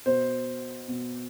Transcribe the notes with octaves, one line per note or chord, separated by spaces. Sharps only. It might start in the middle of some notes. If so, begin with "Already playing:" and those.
B2 C5
B2